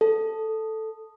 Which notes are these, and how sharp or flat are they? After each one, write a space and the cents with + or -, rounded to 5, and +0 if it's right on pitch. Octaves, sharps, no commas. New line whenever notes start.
A4 +0